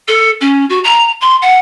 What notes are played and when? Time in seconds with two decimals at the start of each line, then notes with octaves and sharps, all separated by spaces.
0.08 A4
0.41 C#4
0.69 F#4
0.84 A#5
1.21 C6
1.42 F#5